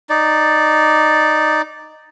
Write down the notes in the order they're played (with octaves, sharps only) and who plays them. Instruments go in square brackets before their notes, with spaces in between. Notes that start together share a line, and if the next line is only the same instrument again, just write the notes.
[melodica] D#4 D5